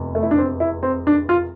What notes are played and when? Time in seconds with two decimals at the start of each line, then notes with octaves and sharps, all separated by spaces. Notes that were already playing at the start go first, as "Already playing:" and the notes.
Already playing: F1 E2 C3
0.15 A3
0.23 E4
0.31 D4
0.38 C4
0.60 E4
0.83 C4
1.07 D4
1.29 F4